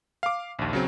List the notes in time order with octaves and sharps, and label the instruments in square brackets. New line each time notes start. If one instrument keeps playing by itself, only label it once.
[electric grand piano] F5 D6
A#1 D#2
C#3 F#3 C4